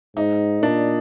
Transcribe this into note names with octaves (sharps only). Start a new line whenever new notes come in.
G#2 D#4
A#2 D4